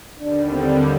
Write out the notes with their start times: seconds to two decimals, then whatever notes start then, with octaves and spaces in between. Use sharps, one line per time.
0.19 D#2 D3 G3 D4
0.53 C4